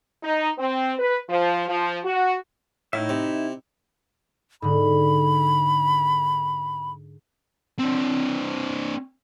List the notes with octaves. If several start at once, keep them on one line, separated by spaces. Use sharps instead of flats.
D#4
C4
B4
F3
F3
F#4
A2 D#4 E4 E5
C3
G#2 D3 B5
C4 D4